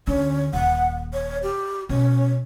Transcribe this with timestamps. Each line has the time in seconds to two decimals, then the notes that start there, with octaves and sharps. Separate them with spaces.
0.07 D2 D3 C#4
0.53 D#1 F#5
1.13 C#5
1.43 G4
1.89 B2 C#4